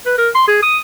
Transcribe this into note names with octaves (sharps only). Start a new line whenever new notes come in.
B4
A#4
C6
G#4
D#6